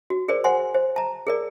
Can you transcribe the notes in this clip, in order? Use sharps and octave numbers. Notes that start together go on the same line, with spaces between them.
F#4
G#4 A#4 C5 D5
C5 F#5 G#5 C6
C5
A5 A#5
G#4 A#4 D5